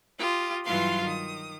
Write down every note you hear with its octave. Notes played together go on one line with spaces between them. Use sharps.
F4 G4 D#6
G2 E3 F#3 F4 F5 C6
D#3 D#6